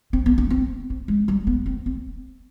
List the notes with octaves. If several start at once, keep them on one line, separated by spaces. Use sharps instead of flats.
C4
B3
D4
C4
C4
G#3
G3
B3
C4
C4